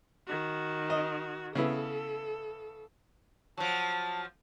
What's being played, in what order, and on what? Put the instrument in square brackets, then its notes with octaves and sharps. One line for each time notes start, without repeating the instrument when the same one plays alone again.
[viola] D#3 F#4
[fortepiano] D#5
[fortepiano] C#3 B3 E4 [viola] A4
[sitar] F3 F#3 [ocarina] A5